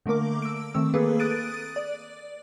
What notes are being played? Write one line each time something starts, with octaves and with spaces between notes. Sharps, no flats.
D3 A3 A#3 A#4 D6
E6 D7
D#3 A3 C4 E6
A#3 G#4 A4 B4
D#6 F#6 A6 D7 D#7
D5